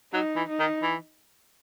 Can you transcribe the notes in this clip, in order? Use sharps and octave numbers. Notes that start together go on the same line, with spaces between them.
F#3 D#4
E3
D#4
D#3
E3